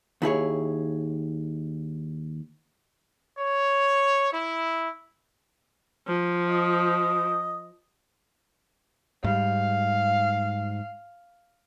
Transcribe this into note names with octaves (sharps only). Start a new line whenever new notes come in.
D#2 E4 G#4 C#5
C#5
E4
F3
D#5
G#2 G3 F5